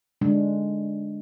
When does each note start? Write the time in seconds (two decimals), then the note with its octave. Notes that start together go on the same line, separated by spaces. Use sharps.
0.21 D3 G#3 D4